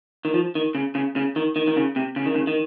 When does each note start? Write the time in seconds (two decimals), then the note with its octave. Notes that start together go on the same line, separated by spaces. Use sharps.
0.25 D#3
0.34 F3
0.55 D#3
0.75 C#3
0.95 C#3
1.16 C#3
1.36 D#3
1.56 D#3
1.68 D#3
1.76 C#3
1.96 C3
2.16 C#3
2.26 D#3
2.35 C#3
2.47 D#3